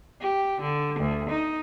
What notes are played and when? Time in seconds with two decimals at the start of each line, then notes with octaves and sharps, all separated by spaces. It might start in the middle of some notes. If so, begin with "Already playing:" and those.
0.20 G4
0.61 D3
0.99 D2
1.30 D#4